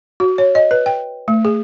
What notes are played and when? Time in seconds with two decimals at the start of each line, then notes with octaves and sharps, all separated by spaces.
0.20 F#4
0.38 C#5
0.55 D#5
0.71 B4
0.86 G5
1.28 A3
1.45 G#4